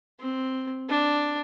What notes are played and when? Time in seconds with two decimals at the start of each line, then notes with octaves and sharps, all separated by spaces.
0.20 C4
0.89 D4